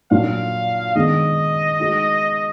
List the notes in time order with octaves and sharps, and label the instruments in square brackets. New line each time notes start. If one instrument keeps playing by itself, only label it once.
[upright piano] A#2 F#3 D4 F#4 [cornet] F5
[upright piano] D#3 G#3 B3 D4 [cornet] D#5
[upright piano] G#3 D#4 F#4